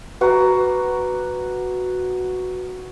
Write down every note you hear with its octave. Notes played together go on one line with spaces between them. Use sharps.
F#4 B4 D5 A#5